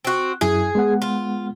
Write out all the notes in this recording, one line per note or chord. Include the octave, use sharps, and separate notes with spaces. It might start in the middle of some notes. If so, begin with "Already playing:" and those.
C4 F#4
F#2 E4 G#4
G#3 B3 F#5
F4